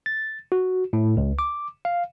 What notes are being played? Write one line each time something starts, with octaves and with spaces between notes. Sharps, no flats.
A6
F#4
A2
C#2
D6
F5